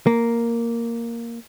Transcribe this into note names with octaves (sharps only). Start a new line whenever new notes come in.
A#3